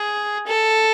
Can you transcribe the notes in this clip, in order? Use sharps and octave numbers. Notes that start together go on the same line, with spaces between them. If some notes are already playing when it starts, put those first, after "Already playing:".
Already playing: G#4
A4